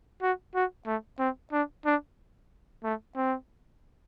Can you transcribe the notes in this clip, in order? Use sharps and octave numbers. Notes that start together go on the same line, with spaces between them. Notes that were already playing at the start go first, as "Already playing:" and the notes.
F#4
F#4
A3
C4
D4
D4
A3
C4